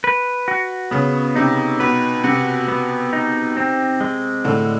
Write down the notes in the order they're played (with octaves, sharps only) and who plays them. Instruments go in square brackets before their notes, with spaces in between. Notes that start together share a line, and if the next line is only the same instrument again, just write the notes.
[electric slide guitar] B4
F#4
[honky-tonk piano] C#3 [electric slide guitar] B3
[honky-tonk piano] C3 [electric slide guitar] D#4
[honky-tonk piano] B2 [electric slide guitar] B4
[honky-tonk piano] C3 [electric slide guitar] F#4
[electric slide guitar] B3
D#4
C4
G#3
[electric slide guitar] A2 [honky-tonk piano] D3